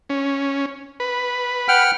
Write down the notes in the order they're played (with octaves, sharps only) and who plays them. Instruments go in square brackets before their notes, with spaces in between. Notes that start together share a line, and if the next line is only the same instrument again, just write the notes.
[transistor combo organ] C#4
B4
[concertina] F#5 G5 F6